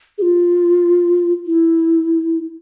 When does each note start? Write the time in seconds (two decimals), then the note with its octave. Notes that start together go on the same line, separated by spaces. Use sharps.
0.18 G#4
0.22 F4
1.47 E4